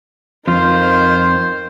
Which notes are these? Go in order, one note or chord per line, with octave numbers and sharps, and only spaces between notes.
F2 D#3 F4 C5